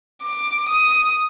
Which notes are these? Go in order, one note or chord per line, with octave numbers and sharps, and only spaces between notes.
D6
D#6